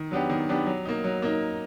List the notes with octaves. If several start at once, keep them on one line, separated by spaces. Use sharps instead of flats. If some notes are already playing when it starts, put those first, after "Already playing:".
Already playing: D#3
F#3 B3 D4 G4
D#3
F#3 B3 D4 G4
F#3
A#3 D#4
F#3
A#3 D#4